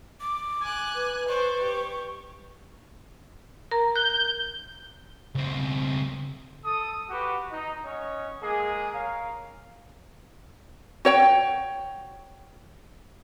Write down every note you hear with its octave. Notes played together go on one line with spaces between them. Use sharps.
D6
G#5 F#6
B4
C5 D5 C#6
G4
A#4 A#5
F#6 G6
C#2 C4
A4 D#6
F#4 G4 B4
D#4
C#4 C#5 D#5 F#5
G#3 A#3 G#4
A#4 C#5 F5
F#4 C#5 G5